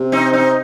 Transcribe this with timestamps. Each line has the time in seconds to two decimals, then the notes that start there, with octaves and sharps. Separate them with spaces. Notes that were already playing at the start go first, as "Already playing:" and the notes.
Already playing: C3
0.12 C4 D#4
0.33 C4 D#4